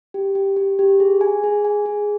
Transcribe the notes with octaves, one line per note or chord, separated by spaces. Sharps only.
G4
G4
G4
G4
G#4
G#5
G#4
G#5
G#4